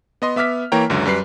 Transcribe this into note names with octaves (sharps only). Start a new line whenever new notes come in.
B3 D#5 C6
B3 E5 D6 F6 B6
E3 A#3 C#5 G5 A#5
C#2 F#2 D3 F#3
F#2 G3 B4 C7